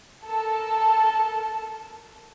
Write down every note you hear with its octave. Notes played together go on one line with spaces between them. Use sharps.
A4 A#4 A5